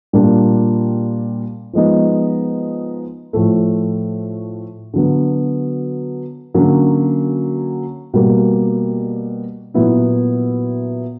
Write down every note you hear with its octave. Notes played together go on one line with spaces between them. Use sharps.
A#2 G3 A#3 D4 F4
F3 G#3 B3 D#4
A2 F3 A3
D3 F#3 B3
D3 F#3 A#3 C#4
B2 G3 A#3
A#2 F#3 B3 E4